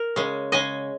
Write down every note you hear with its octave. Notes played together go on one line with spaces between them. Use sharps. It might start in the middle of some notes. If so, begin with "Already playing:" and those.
Already playing: A#4
C#3 G#3
C#3 G#3 D#5 G#5